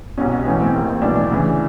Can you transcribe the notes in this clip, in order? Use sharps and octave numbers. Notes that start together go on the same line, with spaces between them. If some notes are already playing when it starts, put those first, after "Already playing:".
C2 B2 C#4
B1 A2 E3 C#4
C4
D#2 D#3
B1 A2 E3 D4
D4
D2 C#3 E3